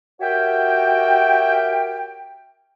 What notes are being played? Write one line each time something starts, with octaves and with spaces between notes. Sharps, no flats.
F#4 G4 A#4 C#5 E5 G5